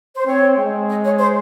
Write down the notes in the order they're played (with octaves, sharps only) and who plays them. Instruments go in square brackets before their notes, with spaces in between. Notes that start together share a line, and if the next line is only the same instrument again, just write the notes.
[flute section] C5
[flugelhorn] C4 [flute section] C#5
[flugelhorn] G#3
[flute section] D#5
C#5
C5